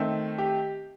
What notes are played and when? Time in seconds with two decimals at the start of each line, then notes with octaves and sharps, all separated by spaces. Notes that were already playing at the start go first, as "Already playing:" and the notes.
Already playing: D#3 A3 C4
0.38 G4